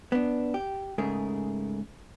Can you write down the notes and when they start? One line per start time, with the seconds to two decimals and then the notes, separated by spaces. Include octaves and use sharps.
0.12 B3 D4
0.54 G4
0.98 G#2 C#3 A3 G#4 A#4